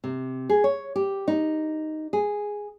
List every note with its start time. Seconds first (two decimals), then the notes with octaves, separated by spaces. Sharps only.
0.04 C3
0.49 G#4
0.64 C#5
0.96 G4
1.28 D#4
2.13 G#4